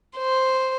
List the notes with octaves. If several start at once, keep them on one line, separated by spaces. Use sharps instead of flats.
C5